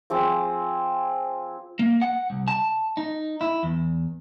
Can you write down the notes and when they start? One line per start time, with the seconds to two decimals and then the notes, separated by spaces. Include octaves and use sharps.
0.10 F3 C4 G#4 D6
1.79 A#3
2.02 F#5
2.30 C2
2.48 A5
2.97 D#4
3.41 E4
3.63 E2